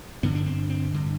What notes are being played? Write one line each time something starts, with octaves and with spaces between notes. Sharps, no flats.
G2 D3 B3
D4
C4
C4
G2 D3